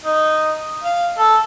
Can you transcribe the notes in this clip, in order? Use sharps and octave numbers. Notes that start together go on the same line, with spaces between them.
D#4
F5
A4